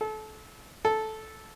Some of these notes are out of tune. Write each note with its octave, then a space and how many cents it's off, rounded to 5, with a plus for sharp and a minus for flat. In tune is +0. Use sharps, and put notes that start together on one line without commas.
A4 -30
A4 -10